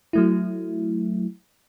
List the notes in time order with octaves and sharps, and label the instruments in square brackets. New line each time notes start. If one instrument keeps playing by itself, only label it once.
[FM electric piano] F#3 A3 E4